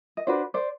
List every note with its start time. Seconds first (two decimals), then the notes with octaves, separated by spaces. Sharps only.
0.17 D#5
0.27 D4 F#4 B4 C5 D5
0.54 C5 D5